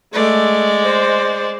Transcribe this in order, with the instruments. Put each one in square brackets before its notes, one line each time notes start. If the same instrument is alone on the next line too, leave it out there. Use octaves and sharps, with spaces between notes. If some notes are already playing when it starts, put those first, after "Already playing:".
[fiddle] G#3 D5 [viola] A3
[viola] C5